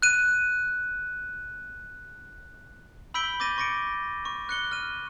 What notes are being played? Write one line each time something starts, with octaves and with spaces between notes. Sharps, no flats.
F#6 D#7
B5 E6 G6 B6 D7 G7
D6 G6 A6 A#6 D#7
C#6 A6 A#6 C#7 D7
C#6
F#6 C#7 G7
F6 D#7